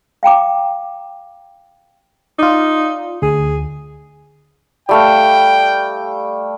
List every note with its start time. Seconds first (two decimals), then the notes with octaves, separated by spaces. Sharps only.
0.23 F5 G5 A#5 D6
2.39 D#4 F4 D5
3.22 D2 G#4
4.89 G3 A3 F5 G5